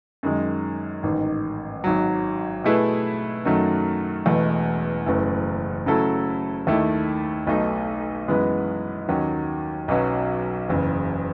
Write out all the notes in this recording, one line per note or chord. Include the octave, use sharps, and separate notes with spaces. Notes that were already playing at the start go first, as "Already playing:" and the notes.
F#2 D#3 G#3
A1 G#2 D#3
G#1 G#2 F#3
B2 A3 E4 G#4 B4
F#2 D#3 F#3 A3
E1 E2 B2 A3
F#1 F#2 E3 A3
C#3 F#3 A3 E4 A4
D#2 D#3 A3 E4
B1 B2 A3 D#4
F#2 E3 G#3 B3
D#2 D#3 F#3 C#4
B1 B2 F#3 C#4
F#1 E2 C#3